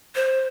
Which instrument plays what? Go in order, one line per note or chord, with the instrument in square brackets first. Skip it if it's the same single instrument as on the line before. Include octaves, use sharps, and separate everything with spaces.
[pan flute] C5